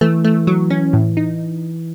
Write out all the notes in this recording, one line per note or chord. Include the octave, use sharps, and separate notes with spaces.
E3 A3
A3
F#3
C#4
A2
D#4